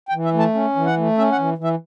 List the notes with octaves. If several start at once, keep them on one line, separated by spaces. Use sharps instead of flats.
G5
E3
E5
A3
A5
C#4
E3
F#5
A3
C#4 E5
F#5
E3
E3
E5